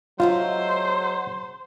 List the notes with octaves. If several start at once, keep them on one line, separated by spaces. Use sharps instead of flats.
F#3 G#3 A3 D#4 F4 C5